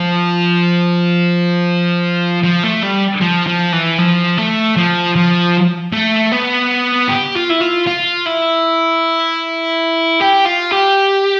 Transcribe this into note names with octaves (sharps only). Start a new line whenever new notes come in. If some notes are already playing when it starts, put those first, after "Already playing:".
Already playing: F3
F3
A3
G3
F3
F3
E3
F3
A3
F3
F3
A3
B3
G4
F4
E4
F4
F4
E4
G4
F4
G4